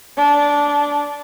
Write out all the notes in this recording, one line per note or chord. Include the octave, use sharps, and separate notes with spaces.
D4